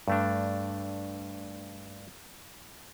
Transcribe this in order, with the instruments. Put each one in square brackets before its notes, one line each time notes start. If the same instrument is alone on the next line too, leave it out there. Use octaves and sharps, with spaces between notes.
[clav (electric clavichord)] G2 A3 D4